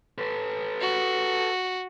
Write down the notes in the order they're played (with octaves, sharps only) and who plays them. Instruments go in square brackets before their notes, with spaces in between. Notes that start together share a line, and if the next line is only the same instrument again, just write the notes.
[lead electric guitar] A4 B4
[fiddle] F#4